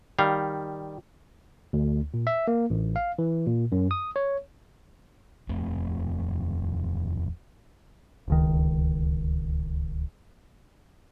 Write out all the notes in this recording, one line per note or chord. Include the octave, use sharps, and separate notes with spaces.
D#3 G3 F5
D2
A#2
E5
A#3
A1
F5
E3
A#2
F#2
D#6
C#5
D#1 F2 A3 C4
D1 C#2 D#3